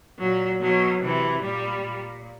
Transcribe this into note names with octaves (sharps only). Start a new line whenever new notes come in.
A#2 F#3
B2 F#3
C3 E3
A#2 G3
A#2